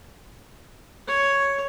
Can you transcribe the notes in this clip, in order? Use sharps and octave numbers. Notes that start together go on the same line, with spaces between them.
C#5